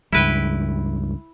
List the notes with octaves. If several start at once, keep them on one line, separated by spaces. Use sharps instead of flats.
C#2 G2 E4 B4 G5